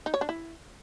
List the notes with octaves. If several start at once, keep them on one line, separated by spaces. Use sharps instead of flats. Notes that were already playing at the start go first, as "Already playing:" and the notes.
D#4
C#5
D4
E4